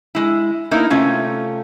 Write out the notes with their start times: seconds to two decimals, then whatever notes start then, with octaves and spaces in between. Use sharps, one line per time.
0.15 G#3 E4
0.71 A#3 B3 D#4 E4 A#4
0.90 C3 A3 C#4 F4